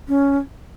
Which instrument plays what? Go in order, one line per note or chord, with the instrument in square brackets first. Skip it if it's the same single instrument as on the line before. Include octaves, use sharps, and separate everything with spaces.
[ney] C#4